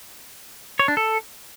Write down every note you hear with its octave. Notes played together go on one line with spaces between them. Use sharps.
C#5
D4
A4